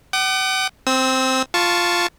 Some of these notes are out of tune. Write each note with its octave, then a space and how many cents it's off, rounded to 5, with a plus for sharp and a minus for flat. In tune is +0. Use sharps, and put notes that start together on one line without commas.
F#5 +45 D6 +45
C4 +0 E6 -35
F4 +0 A5 +0 C#6 +0